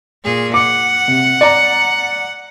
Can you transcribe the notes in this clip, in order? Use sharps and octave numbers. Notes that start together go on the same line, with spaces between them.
A#2 G#4
F#5 D6
C3
D5 A#5